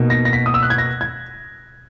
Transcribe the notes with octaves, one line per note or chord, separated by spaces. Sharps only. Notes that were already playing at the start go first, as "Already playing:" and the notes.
Already playing: B2 A#3 D#4
A#6
A#6
B6
D#6
E6
F#6
G#6
A#6
G#6